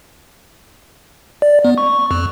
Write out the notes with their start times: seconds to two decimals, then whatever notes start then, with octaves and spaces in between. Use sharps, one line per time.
1.42 D5
1.65 B3
1.78 C#6
2.11 F2